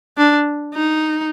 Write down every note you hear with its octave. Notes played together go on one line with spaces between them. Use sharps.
D4
D#4